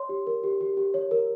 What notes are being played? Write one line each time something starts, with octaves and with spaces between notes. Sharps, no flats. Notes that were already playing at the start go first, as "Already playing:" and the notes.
Already playing: C#5 C6
G4
A#4
G4
G4
G4
C#5
A#4